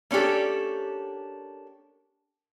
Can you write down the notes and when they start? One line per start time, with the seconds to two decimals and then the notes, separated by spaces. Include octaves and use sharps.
0.11 A#3 C#4 D4 G4 A4